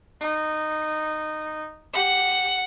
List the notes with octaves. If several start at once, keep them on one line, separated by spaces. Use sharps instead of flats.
D#4
G4 F#5